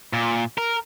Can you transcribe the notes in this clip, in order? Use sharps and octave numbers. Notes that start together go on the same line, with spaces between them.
A#2
A#4